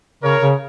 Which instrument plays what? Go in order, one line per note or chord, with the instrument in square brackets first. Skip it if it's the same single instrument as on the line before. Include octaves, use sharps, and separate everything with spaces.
[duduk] C#3 [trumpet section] A#4 C#5
[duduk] C#3